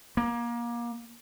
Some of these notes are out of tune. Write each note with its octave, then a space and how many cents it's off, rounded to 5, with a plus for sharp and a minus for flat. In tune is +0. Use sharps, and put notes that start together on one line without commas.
A#3 +25